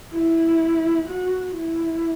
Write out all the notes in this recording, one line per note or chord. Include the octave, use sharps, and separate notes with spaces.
E4
F#4
E4